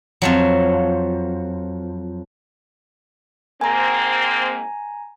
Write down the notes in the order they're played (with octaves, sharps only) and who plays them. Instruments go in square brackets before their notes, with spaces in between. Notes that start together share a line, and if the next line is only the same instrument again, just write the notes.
[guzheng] F2 F3 F#3
[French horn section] G#2 A#3 C4 [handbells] G#5 A#5